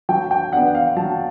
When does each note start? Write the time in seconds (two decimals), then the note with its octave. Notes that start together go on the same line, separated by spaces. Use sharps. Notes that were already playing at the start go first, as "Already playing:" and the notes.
0.09 F#3 G5
0.31 G5
0.53 B3 D4 F#5
0.75 F5
0.97 F#3 A5